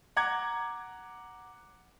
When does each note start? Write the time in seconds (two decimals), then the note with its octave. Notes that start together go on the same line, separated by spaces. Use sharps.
0.17 F#5 A#5 D6 G#6